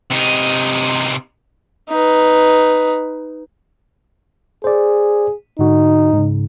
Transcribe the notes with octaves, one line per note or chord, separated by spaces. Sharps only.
C3 D#4
D#4 B4
G#4 C5 D5
G#2 D3 D#4 F#4
G#2 C#3